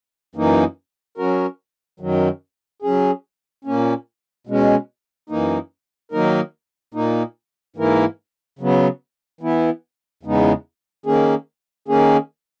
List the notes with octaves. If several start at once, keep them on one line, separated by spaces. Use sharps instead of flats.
F#2 E3 A#3 D#4
F#3 C#4 F#4 A#4
F#2 D#3 F#3
F#3 C#4 G#4
A#2 A#3 C#4
B2 G#3 C#4
F#2 E3 A#3 D#4
D#3 F#3 A#3 D#4 A#4
A#2 A#3 D#4
G#2 E3 A#3 E4 A#4
C#3 F#3 B3
E3 B3 E4
E2 C#3 G#3 B3 D#4
D#3 A#3 C#4 G#4
D#3 A#3 C#4 G#4